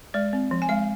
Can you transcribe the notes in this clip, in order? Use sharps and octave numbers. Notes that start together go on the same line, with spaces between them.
G#3 D5
C4
F3
G#5
G#3 F5